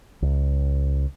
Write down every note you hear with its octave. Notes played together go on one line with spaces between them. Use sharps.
C#2